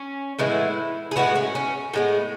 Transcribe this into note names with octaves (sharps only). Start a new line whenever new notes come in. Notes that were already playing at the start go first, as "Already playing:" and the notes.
Already playing: C#4
A2 E3 G#3 B3 E4
G#4
A2 G#3 B3 F#4
C#4
C#4
A2 G#3 B3